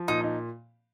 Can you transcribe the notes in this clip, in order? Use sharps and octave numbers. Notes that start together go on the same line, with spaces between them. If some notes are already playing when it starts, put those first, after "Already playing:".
Already playing: F3
A#2 D#4
D#4